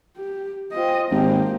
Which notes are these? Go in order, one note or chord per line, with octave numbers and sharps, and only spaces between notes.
G4
C4 F4 G#4 D#5
G#1 F3 A#3 G4 G5